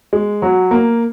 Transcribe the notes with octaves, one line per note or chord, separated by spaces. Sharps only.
G#3
F#3
A#3